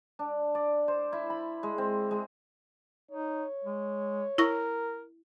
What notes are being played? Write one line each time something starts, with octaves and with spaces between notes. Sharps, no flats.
D4
D5
C5
E4
B5
G#3
C4
G#3
D#4 C#5
G#3
E4 A#4 C#6 A#6